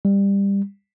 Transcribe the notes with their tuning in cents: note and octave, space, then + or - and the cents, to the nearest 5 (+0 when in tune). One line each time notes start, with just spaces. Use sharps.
G3 +20